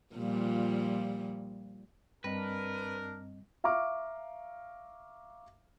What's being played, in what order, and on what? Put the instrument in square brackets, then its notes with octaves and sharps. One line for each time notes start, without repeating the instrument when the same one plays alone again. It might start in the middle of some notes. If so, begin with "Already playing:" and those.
[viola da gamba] A#2 F3 G3
[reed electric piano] G2 C4 D#5 [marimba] G3 [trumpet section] D4 A#4 [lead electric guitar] B4
[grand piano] E5 F5 A#5 C#6 D6 F6